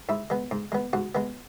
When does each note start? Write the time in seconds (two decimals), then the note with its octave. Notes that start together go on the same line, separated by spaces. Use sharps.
0.09 G#2 E4
0.30 G#3 B3
0.51 G#2
0.72 G#3 B3
0.93 G#2 F#4
1.15 G#3 B3